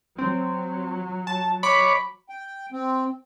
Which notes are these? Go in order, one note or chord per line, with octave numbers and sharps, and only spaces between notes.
F#3 C4
A5
C#5 B5 D6
G5
C4